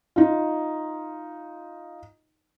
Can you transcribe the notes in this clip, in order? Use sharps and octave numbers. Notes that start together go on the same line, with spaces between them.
D#4 F4